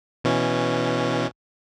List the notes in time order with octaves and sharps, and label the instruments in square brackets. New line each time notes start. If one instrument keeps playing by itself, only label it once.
[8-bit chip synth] B2 E3 C#4